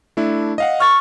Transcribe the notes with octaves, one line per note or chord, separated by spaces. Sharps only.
A3 D4 E4
D#5 F5 F#5
C#6 F6 A6